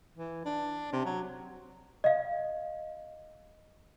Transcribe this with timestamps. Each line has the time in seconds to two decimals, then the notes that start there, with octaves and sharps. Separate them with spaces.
0.16 E3
0.46 D4
0.93 C3
1.06 F#3
2.04 D#5 F5